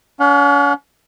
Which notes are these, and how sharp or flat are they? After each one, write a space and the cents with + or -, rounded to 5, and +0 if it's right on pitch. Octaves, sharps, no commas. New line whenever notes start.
C#4 +40 F#5 -40